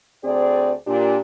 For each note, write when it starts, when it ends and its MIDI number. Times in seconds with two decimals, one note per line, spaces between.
0.24 0.73 38
0.24 0.73 60
0.24 0.73 68
0.24 0.73 74
0.87 1.18 46
0.87 1.18 62
0.87 1.18 67